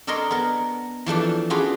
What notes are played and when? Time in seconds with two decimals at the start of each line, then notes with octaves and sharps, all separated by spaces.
0.07 D4 A4 A#4 C#5 D#5 C6
0.31 B3 A#4
1.06 E3 F3 A3 D4
1.50 C#4 D4 F4 F#4 G#4 B4